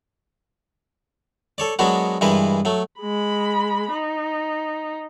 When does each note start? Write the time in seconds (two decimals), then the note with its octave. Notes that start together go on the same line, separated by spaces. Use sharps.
1.58 A4 C#5 D5
1.79 F#3 G#3 B3 D4 F#4 A#4
2.21 G2 E3 G#3 A#4 B4
2.65 F#3 A3
3.00 G#3 B5
3.92 D#4